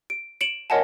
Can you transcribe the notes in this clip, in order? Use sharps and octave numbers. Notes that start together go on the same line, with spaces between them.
D7
C#7 D7 E7 F#7
A#4 C#5 D#5 F#5 G#5 A5